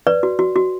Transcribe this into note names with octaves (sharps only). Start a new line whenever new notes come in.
B4 D5
F#4
F#4
F#4